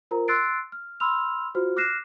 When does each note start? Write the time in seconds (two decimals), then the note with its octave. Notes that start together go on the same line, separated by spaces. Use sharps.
0.11 F4 A#4 C5 A#5
0.28 C6 E6 F#6 A6 C7 D7
0.72 F6
1.00 B5 C6 E6 F6 F7
1.55 F4 F#4 C5 F6
1.76 D6 F6 F#6 A#6 C7 E7